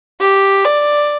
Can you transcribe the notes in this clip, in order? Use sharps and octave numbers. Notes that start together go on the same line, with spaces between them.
G4
D5